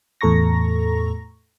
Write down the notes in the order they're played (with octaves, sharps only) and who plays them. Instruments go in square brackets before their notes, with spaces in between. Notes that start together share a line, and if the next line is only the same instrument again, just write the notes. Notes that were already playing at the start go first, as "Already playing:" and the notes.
[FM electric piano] E2 A2 A4 A#5 C#6 A#6